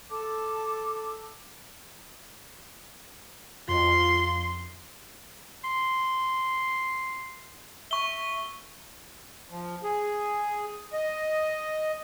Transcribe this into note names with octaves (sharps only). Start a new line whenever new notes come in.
A4 A5 D6
F2 F4 C6
C6
E5 C#6 G7
F3
G#4
D#5